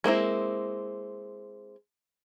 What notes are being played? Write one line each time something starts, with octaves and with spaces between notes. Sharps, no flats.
G#3 A#3 C4 E4